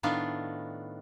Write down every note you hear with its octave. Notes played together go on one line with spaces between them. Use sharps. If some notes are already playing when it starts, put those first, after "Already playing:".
A2 D#3 B3 D4 F4